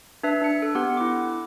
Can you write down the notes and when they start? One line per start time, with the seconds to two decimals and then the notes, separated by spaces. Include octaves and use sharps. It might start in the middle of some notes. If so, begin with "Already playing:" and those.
0.23 D4 B4 E5
0.41 D4 C#7
0.62 A4
0.75 B3 G4 F#5
0.97 E4 D6